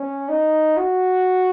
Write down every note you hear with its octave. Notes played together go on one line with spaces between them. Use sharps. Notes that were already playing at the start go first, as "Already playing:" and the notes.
Already playing: C#4
D#4
F#4